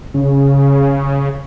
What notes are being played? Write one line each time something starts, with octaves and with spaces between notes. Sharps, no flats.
C#3